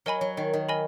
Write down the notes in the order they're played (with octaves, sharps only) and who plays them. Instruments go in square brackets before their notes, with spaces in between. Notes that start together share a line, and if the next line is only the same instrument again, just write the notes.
[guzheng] F#3 [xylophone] A#4 D#5 G#5 B5
[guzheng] F#3
D#3
D#3
[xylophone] A#4 D#5 G#5 B5